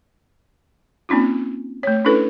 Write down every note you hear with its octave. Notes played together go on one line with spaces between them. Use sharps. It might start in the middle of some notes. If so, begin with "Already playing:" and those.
A#3 C4 C#4 D#4 F4
A3 C#5
C#4 D4 E4 A4 B4